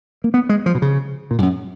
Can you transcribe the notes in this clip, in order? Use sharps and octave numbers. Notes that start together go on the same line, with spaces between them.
A#3
B3
G#3
F3
B2
C#3
A#2
G#2
F#2